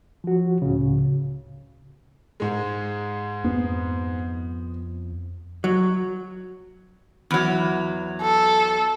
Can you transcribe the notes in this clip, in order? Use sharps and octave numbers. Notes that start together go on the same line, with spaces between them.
F3 F#4
C#2 A2 C#3
G#2 G#3
F2 B3
F#3
E2 F#3
A4